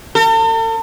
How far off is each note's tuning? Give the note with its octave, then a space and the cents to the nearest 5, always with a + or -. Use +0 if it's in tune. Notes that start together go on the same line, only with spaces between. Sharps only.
A4 +45